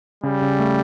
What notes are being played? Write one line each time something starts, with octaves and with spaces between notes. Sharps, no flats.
C#3 G3
C#3
A3